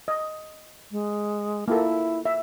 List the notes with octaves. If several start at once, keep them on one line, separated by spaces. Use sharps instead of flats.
D#5
G#3
A#3 E4 F4 A4
E5